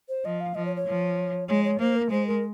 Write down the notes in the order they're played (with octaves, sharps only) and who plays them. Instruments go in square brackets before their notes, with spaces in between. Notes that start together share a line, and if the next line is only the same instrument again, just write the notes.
[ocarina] C5
[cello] F3 [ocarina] D#5
[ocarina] F5
[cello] F3 [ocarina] D#5
[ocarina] C#5
C#5
[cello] F3
[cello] G#3 [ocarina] C#5
[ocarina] C#5
[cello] A#3 [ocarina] C5
[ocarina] A#4
[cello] G#3 [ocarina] C5
[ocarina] A#4